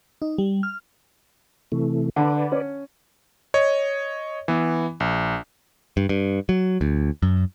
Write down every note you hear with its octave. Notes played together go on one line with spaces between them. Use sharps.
D#4
G3
F6
C3 E3 A3
D3 B4 D5
C#4
C#5 D#5
E3 B3
A#1
G2
G2
F#3
D2
F#2